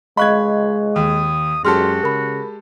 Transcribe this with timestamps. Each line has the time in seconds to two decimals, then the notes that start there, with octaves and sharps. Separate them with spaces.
0.17 G#3 D#5 F5 B5 C#6 F#6 G#6
0.96 D#2 D#6
1.65 F#2 G#3 F#4 G4 A4 C6 F6
2.03 C#3 A#4 B5